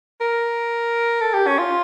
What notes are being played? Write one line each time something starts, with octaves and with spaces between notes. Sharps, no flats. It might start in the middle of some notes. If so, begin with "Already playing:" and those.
A#4
A4
G4
C#4
F4